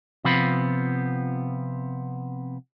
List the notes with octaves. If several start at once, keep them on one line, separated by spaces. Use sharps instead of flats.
C3 F3 B3 C4 F4 B5